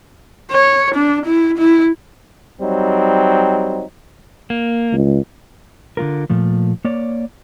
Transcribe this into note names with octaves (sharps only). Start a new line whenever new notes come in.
C#5
D4
E4
E4
F#3 G3 C4 D#4
A#3
C#2
D3 A3 F4 A#4
A#2 F3 A3
A#3 C#5 D5